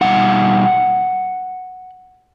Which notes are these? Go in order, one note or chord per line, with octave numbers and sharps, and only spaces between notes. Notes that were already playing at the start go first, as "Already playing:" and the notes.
B2 G3 D#4 F#5